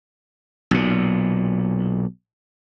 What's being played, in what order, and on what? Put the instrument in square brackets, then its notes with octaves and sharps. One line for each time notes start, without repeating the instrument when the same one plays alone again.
[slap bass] B1 A#2